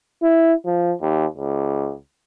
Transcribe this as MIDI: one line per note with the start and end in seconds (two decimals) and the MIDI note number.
0.22 0.53 64
0.66 0.93 53
1.02 1.26 39
1.38 1.93 37